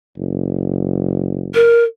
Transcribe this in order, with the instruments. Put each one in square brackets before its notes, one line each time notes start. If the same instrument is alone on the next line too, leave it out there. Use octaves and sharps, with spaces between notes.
[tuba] F#1
[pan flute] A#4